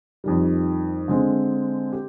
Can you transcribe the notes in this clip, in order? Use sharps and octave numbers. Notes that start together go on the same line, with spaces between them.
F2 D#3 G3
D3 G#3 C4
G4